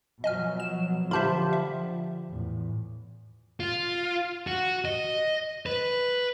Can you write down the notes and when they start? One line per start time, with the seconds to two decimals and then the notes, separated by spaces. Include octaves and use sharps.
0.24 B2 F3 F#3 D#5 G#5 F6
0.60 E7
1.11 D3 F3 F4 G4 C5 E5 A5 B5
1.53 E5
2.28 E2 A2
3.60 F4
4.47 F#4
4.85 D#5
5.66 B4